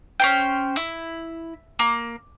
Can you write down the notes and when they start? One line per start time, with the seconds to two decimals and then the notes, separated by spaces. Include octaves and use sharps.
0.20 C#4 C5 G5
0.76 E4
1.79 A#3